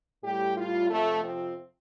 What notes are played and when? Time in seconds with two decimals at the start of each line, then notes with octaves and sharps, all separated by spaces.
0.24 A2 G3 G4
0.57 F4
0.90 F2 C3 F3 A3
1.23 C4